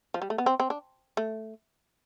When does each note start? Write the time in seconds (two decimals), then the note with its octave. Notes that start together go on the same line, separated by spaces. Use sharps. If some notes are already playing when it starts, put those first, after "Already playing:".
0.14 F3
0.22 G3
0.30 A3
0.38 B3
0.46 C4
0.60 C4
0.70 D4
1.17 A3